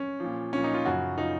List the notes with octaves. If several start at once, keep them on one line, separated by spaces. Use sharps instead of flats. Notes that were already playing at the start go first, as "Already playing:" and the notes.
Already playing: C#4
A#2 F3
A#2 F3 C#4
D#4
F4
F#2 C#3 F3 F#4
C#3 F3 D#4